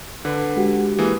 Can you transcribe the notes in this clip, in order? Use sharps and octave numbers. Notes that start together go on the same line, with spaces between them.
D3 B4
G#3 F#4 G4
E3 A#3 G#4